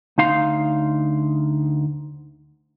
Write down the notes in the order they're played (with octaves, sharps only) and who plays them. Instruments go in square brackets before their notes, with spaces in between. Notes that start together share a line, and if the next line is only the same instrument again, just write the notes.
[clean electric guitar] D2 D#4 F5 C6